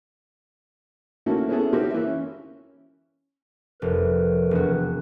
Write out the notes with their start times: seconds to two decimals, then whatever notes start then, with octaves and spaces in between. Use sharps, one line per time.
1.26 A3 A#3 C#4 D#4 E4 F#4
1.49 B3 C#4 E4 G#4 A4
1.73 C4 D#4 F#4 G4 A#4
1.90 E3 A#3 E5
2.06 C#4
3.82 F1 A#4 B4
4.51 E1 F#4